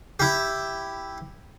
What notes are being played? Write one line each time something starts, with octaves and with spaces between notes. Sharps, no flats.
E4 G4